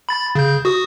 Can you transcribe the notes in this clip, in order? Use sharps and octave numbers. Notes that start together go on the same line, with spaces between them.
B5 A6
C#3 G6
F#4 D#6